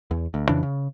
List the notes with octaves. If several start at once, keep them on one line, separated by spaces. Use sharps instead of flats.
E2
D2
F2 C#3 E3 D4
C#3